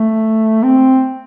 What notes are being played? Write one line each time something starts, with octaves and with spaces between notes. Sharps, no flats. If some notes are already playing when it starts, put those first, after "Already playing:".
Already playing: A3
C4